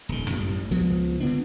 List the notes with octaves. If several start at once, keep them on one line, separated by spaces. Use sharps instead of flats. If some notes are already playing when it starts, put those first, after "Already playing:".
D#1 D#3
A1 F#2 G3
C#2 F3 G#3 B3
D3 B3 D4